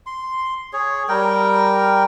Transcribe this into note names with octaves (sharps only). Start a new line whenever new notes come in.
C6
G#4 C#5
G3 A#4 G5